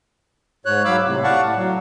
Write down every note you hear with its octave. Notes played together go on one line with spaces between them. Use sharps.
G#2 C#5 F#6
F#3 F5 B5 D6 E6
A2 C3
D5 F5 F#5 A5 C#6
A2
F#3